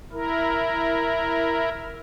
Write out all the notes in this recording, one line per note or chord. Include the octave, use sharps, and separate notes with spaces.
E4 A#4